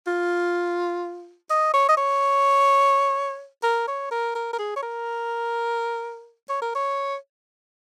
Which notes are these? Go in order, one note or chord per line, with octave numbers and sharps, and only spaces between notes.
F4
D#5
C#5
D#5
C#5
A#4
C#5
A#4
A#4
A#4
G#4
C#5
A#4
C#5
A#4
C#5